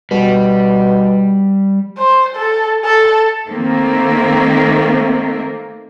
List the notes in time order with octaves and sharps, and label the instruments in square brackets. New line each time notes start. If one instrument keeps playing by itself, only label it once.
[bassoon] B2 [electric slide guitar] G3
[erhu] C5
A4
A4
[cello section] D#3 A3 A#3 C4